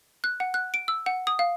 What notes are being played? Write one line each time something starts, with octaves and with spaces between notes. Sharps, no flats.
F#6
F#5
F#6
D7
E6
F#5
D#6
F5